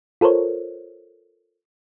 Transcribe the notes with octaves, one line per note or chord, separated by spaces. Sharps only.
F4 A4 A#4 C5 C#5